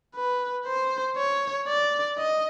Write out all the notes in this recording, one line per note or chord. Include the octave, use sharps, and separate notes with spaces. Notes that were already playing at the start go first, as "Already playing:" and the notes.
B4
C5
C#5
D5
D#5